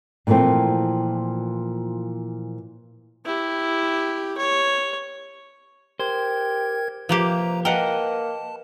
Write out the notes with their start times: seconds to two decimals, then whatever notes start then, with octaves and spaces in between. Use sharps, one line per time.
0.27 A#2 E3 F3 A3 C4
3.25 E4 G4
4.38 C#5
6.00 G4 A#4 C5 G#6
7.09 C3 F3 A#3 G4 B4 A#5
7.65 A#3 A#4 B4 D#5 F#5 G5 A5